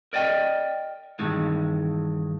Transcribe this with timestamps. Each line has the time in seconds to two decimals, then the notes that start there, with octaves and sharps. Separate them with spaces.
0.13 A#4 D5 D#5 G5
1.19 G2 D#3 E3 G#3